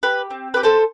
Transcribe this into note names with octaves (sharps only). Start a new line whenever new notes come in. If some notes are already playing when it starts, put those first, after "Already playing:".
G4 B4
C4
G4 B4
A4 C5